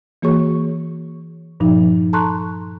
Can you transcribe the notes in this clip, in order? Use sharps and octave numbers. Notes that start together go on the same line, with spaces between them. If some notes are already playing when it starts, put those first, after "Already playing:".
E3 A#3 F#4 G#4 C#5 C#6
G2 A#2 F3 D#4
A4 A5 A#5 C6 C#6 F#6